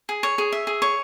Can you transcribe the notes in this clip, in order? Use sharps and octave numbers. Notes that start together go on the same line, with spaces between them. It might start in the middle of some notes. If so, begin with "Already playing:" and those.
G#4
C#5
G#4
E5
G#4
C#5